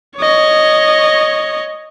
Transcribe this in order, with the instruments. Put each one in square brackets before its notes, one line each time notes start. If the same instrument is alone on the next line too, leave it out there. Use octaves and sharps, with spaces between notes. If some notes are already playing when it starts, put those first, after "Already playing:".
[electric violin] C#5 D#5